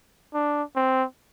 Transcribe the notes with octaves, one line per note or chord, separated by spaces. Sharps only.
D4
C4